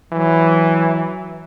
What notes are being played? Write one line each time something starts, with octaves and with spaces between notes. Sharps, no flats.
E3 F#3